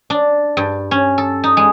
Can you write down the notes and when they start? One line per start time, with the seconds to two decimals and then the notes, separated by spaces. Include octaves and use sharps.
0.10 D4
0.57 G2
0.91 C#4
1.18 A4
1.44 D#4
1.57 G#3